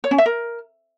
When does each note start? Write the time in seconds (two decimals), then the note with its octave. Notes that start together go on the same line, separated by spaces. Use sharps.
0.04 C#5
0.11 C#4
0.18 E5
0.26 A#4